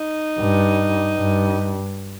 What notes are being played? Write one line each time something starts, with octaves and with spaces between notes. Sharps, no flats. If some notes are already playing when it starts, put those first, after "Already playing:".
Already playing: D#4
G2
G2